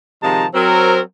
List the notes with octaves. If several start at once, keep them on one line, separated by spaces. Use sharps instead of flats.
C3 D#3 F3 G#3 A5 A#5
F#3 C4 A#4